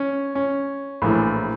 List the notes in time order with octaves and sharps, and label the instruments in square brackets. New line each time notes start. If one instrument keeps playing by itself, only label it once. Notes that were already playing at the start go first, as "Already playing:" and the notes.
Already playing: [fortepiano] C#4
C#4
A#1 A2 E3